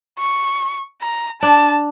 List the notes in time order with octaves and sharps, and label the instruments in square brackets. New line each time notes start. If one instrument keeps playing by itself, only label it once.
[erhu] C#6
A#5
[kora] D4 [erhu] A5